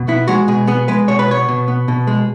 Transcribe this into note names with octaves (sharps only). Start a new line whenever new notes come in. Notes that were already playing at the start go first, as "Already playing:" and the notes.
Already playing: B2
B3 E4
G#3 F#4
B2 G#4
B3 G#4
G#3 B4
B2 C#5
B4
B3 C#5
B2
B3
B2
G#3